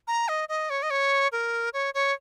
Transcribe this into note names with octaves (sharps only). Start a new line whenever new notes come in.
A#5
D#5
D#5
C#5
D#5
C#5
A#4
C#5
C#5